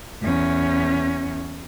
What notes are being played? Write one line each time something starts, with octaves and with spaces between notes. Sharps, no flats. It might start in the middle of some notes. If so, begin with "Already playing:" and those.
E2 C#4